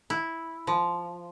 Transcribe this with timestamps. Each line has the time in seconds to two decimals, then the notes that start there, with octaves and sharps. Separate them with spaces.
0.10 E4
0.67 F3